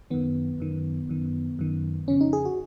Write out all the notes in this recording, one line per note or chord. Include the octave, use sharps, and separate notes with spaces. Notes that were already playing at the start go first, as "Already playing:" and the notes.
F#2 D#3 B3
F#2 D#3
F#2 D#3
F#2 D#3
F2 C#3 C#4
D#4
G#4
F#4